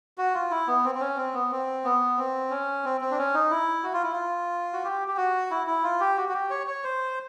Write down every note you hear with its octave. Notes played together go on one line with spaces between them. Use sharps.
F#4
F4
E4
B3
C4
C4
C#4
C4
B3
C4
B3
C4
C#4
C4
C4
D4
C#4
D#4
E4
F#4
F4
E4
F4
F#4
G4
G4
F#4
E4
E4
F4
G4
F#4
F#4
G4
C#5
C#5
C5